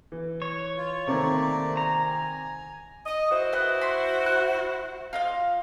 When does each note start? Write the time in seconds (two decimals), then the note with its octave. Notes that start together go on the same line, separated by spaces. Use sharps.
0.12 E3
0.42 C#5
0.77 F4
1.07 C3 D#3 A3 A#3 C4 D5
1.77 G#5 A#5
3.06 D#5
3.31 E4 F#4 C5
3.53 B4 D#5 F#5
3.81 B5 C6
4.26 F#6
5.13 F4 D#5 F5